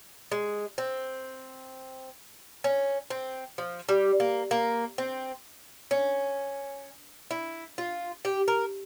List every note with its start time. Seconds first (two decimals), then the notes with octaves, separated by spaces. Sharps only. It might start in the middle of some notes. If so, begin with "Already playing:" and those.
0.31 G#3
0.78 C4
2.64 C#4
3.10 C4
3.58 F3
3.89 G3
4.20 A#3
4.51 A#3
4.98 C4
5.91 C#4
7.31 E4
7.78 F4
8.25 G4
8.48 A#4